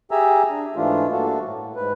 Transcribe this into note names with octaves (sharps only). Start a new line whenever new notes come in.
G4 G#4 E5 G#5 A#5 E6
D4
G#2 E3 A3 D4 F4
G2 A#3 D4 F#4 A4
A2
G#2 B4